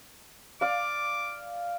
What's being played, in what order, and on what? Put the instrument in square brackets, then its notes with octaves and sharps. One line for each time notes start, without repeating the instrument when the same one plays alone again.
[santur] D5 F5 [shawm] D6